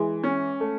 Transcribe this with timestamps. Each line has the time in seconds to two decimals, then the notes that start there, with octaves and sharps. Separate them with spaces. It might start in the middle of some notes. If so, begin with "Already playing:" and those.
Already playing: E3 G#3
0.23 C#4
0.60 A3